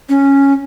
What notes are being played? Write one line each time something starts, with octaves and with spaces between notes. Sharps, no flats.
C#4